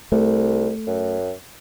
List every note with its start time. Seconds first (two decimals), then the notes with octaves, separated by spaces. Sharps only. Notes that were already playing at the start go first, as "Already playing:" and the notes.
0.12 C2 A3
0.87 F#2